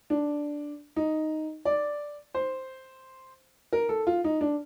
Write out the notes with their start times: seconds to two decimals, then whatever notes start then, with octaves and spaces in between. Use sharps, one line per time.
0.10 D4
0.96 D#4
1.65 D5
2.34 C5
3.73 A#4
3.89 A4
4.07 F4
4.24 D#4
4.41 D4